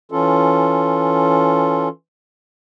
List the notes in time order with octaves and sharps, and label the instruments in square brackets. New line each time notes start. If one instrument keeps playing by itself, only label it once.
[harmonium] E3 C#4 F4 A4